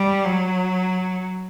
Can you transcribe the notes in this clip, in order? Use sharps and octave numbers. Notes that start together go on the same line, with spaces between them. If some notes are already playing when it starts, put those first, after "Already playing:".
Already playing: G3
F#3